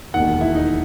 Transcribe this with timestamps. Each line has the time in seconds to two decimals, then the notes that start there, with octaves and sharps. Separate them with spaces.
0.14 E1 D#2 D#3 F#5
0.41 E4
0.55 D#4